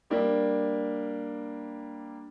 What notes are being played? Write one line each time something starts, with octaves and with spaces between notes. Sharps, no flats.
G3 A#3 D4